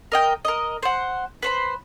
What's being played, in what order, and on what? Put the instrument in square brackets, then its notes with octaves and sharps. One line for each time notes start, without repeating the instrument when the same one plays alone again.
[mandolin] A#4 D#5 G5
A#4 D#5
C5 F#5
B4 C5 B5